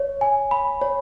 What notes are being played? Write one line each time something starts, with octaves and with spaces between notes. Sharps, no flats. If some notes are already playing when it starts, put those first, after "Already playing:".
Already playing: C#5
G#5
B5
C#5